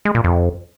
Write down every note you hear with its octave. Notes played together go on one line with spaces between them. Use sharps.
G#3
A#2
F2